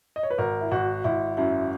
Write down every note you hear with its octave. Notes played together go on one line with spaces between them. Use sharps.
D#5
C#5
B4
G#1 A#4
E4
G#1 F#4
G#1 E4
F#2 E4